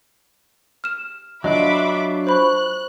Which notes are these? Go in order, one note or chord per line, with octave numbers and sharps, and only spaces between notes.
F6 E7
F#3 D4 F4 D#5 E5 B5 D6
C5 B5 C#6 F#6